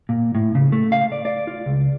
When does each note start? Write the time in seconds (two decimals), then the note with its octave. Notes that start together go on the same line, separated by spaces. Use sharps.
0.09 A#2
0.35 A2
0.55 C#3
0.72 A3
0.92 F5
1.12 D5
1.25 D5
1.47 F4
1.66 C#2